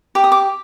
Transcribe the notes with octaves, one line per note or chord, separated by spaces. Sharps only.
G4 D6
D#6
D6